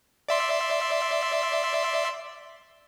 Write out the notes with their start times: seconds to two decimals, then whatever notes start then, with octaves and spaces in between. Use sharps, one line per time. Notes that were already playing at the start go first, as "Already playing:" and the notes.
0.29 D5 E5 C6